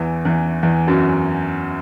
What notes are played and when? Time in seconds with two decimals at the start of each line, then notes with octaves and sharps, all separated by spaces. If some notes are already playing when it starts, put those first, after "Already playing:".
Already playing: E2 E3
0.25 E2 E3
0.63 E2 E3
0.88 F#2 F#3